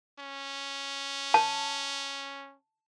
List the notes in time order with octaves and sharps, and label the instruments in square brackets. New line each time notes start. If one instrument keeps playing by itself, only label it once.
[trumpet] C#4
[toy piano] A5